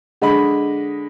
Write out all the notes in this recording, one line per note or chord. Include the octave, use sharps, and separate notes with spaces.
D3 G#3 D#5 B5